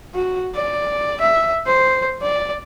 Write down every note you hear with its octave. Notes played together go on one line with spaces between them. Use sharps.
F#4
D5
E5
C5
D5